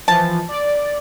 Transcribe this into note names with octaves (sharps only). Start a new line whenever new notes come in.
E3 F3 A5
D5